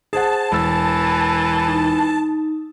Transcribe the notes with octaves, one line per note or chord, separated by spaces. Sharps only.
G#4 C5 F#5 A5
E1 E3 E6
D#4